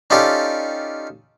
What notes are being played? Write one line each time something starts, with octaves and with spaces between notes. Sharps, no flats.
C#4 D#4 F4 G4 A4 D5